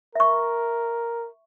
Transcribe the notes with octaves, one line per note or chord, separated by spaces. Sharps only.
A#4 E5 C#6